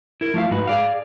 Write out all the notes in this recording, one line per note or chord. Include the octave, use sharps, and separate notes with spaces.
E4 A#4
F3 A3 F4 E5 F5
G#2 D#4 F#4 B4
G#4 D5 F5